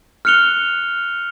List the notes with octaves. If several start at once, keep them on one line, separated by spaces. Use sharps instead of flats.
F6 F#6 C#7 F7 G7